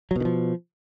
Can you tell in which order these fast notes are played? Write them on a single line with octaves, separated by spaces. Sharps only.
F#3 B2 D#3 F3